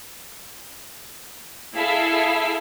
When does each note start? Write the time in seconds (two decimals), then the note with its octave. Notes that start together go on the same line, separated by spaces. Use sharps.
1.75 E4 G#4 A4 E5 F5